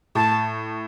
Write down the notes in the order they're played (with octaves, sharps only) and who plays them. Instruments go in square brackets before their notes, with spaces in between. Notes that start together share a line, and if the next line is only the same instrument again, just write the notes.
[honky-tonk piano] A2 [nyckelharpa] A5